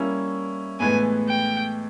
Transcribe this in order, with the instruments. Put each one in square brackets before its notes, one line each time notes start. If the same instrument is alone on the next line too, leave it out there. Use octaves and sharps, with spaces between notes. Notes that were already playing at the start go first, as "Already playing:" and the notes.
Already playing: [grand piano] G3 A#3 C#4 E4
[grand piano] A2 E3 G#3 B3 [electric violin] G#5
[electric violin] G5